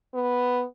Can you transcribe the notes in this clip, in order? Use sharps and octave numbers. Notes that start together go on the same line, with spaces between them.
B3